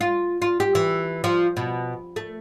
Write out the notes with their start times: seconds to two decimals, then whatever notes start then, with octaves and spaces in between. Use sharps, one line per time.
0.01 F4
0.42 F4
0.60 G4
0.75 E3
1.24 F3
1.57 B2
2.16 A3